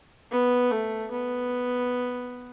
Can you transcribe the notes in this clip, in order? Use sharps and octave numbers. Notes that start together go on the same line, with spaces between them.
B3
A3
B3